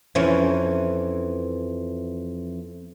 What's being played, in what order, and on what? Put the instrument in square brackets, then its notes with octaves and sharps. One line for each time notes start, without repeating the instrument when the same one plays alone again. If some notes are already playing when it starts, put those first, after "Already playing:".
[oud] F2 E3 C#4